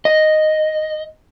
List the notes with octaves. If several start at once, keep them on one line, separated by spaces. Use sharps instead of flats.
D#5